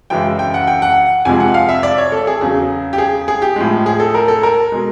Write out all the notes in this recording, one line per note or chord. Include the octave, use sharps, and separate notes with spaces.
F#2 C#3 E3 G#3 G5
G5
F#5
G5
F#5
F2 C3 F3 G#3 G#5
F#5
F5
E5
D5
C#5
A4
G#4
E2 C#3 F#3 G#4
G4
G#4
G#4
G4
A2 F3 G#3
G#4
A4
A#4
A4
A#4
B2 G#3